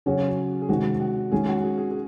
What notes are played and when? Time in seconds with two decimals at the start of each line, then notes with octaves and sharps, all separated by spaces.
0.06 C#3 F#3 C#4 F#4 G#4 C#5
0.62 G#4
0.69 C3 D#3 G#3 C4 F#4
1.00 F#4
1.32 D#3 G#3 C#4 G#4
1.48 F#4
1.64 G#4
1.78 G#4
1.91 G#4